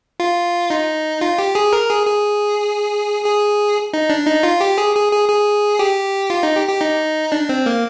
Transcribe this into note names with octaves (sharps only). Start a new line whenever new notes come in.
F4
D#4
F4
G4
G#4
A#4
G#4
G#4
G#4
D#4
D4
D#4
F4
G4
G#4
G#4
G#4
G#4
G4
F4
D#4
G4
G4
D#4
D4
C4
A#3